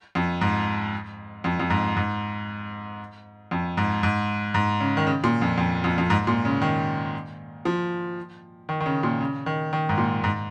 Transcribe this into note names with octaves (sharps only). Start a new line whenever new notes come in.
F2
G#2
F2
F2
G#2
G#2
F2
G#2
G#2
G#2
C#3
D#3
C#3
A#2
F2
F2
F2
F2
G#2
A#2
C#3
D#3
F3
D#3
D#3
C#3
A#2
C#3
D#3
D#3
G#2
A#2
G#2